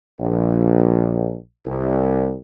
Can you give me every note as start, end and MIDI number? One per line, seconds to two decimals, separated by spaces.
0.20 1.34 34
1.66 2.35 36